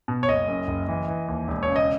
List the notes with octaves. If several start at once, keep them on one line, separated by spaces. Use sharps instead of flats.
B2
C#5
F#1 D#5
F#2
F#1
E3
E3
D#2
E1
C#5
C#3
D#5